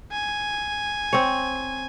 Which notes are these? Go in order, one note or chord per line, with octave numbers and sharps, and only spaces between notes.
G#5
C4 C#5